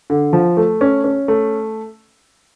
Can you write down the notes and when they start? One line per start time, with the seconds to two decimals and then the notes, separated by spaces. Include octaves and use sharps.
0.10 D3
0.33 F3
0.57 A3
0.81 C#4
1.04 C#4
1.28 A3